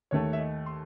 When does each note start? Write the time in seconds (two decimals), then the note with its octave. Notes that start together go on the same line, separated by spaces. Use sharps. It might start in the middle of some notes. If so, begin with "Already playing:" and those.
0.11 D#2 D#3 A3 C#5
0.33 E5
0.39 D#5
0.66 C6